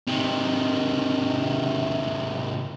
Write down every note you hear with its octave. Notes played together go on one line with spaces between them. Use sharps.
C3 D#3